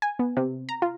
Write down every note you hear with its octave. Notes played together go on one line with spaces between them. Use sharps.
G#5
B3
C3
A#5
F4